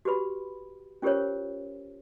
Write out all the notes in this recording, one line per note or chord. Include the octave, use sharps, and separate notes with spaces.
F#4 G4 B4 B5
C#4 F4 G4 A#4 C5 C#5